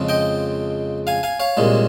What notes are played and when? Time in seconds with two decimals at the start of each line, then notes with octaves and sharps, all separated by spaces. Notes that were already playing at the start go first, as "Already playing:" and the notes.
Already playing: F2 C#3 F3 G#3
0.09 D#5 G5
1.07 F5 G#5
1.23 F5 G#5
1.40 C#5 F5
1.57 C2 A#2 G#3